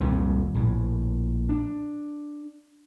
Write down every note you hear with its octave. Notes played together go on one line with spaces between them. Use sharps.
D#1 C2 F2 C3
A#1 A2
D4